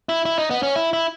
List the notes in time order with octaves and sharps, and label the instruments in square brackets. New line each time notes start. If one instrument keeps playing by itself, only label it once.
[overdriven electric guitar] E4
E4
D#4
B3
C#4
E4
E4